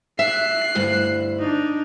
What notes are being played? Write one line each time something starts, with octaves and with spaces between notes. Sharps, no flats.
E5 F#6 C7
D2 G2 E4
D4 D#4